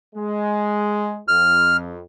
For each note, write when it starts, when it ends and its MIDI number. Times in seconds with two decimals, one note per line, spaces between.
0.15 1.20 56
1.28 2.01 41
1.28 1.77 89